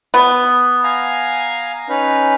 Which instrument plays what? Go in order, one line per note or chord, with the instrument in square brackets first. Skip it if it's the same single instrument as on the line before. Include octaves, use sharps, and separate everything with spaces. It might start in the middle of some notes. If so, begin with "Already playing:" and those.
[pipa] B3
[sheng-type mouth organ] F5 G#5 A#5
C#4 D#4 B4